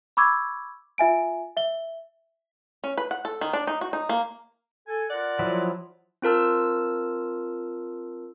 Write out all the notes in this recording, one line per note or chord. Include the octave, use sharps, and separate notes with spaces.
B5 C#6 D6 E6 G#6
F4 E5 G#5 D7
E5 G7
C#4
B4
F#5
A4
D#3
D4
D#4
F#4
D#4
A#3
A4 G#5
F4 A#4 D5 F#5
F3 F#3 E4
C4 F4 A#4 A5 E6